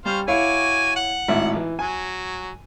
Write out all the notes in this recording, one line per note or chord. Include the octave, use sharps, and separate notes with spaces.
G3 C#4 C5 F5
E4 F#4 C#5 F5 G#5 D6
F#5
G#1 A2 E5
E3
F#3 G#5